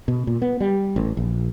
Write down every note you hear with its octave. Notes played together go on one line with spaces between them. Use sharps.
B2
A#2
B3
G3
A1
A#1